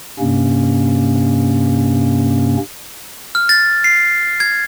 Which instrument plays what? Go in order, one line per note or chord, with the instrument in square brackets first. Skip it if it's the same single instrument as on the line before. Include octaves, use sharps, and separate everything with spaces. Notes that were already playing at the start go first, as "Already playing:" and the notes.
[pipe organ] G2 C3 A#3 C#4
[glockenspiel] F6
A6
C7
G#6